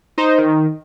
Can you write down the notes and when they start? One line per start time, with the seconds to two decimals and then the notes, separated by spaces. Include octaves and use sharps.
0.18 D#4 C5
0.38 D#3